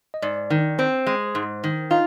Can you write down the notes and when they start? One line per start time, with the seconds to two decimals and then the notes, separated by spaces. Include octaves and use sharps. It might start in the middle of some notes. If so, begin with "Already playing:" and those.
0.14 D#5
0.22 G#2 D5
0.50 D#3
0.79 C4 C5
1.07 G#3
1.35 G#2
1.64 D#3
1.91 D#4 F4